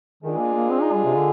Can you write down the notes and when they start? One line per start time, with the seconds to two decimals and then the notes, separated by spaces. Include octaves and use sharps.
0.23 D#3 G#3 D4 F4 G#4
0.38 A#3
0.54 A#3
0.70 C4
0.81 D#4
0.93 G3
1.04 C3
1.16 D3